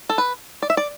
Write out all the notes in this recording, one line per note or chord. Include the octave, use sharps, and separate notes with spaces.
A4
B4
D5
E5
D5